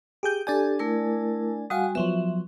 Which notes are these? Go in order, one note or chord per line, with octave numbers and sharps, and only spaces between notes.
G4 G#4 G6
D4 G4 A4 D5 G#5
A3 E4 A#4
G3 F#4 F5 F#5 G#5 D#6
F3 F#3 B3 E5